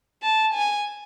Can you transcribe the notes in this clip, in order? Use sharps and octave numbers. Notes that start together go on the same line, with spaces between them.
A5
G#5